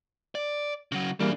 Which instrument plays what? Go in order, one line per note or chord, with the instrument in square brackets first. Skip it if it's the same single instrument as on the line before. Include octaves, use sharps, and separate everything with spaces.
[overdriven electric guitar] D5
C#3 F#3
[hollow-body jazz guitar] E3 G3 A#3 [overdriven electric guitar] D4 G#4